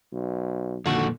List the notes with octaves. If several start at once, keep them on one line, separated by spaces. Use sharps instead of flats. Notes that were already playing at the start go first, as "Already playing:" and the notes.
B1
F2 A#2 D3 D#3 F#4